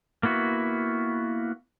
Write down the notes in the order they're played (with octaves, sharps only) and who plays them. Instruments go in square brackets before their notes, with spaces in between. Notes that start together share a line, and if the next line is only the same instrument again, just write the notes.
[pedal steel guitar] A#3 B3 E4 F#4